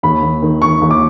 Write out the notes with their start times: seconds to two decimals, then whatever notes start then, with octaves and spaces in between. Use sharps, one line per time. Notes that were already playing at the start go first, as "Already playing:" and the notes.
0.03 D#2 B5
0.23 D#2
0.42 D#3
0.62 D#3 C#6
0.82 D#2
0.91 D6